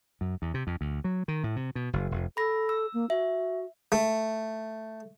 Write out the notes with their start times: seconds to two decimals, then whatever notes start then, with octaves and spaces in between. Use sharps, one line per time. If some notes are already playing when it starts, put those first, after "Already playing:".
0.21 F#2
0.42 E2
0.54 C3
0.67 F2
0.81 D2
1.04 F#3
1.28 D#3
1.44 A2
1.56 C3
1.75 B2
1.93 F#1
2.11 F1
2.37 A4 B5 A#6
2.69 E6
2.94 A#3
3.10 F#4 E5
3.92 A3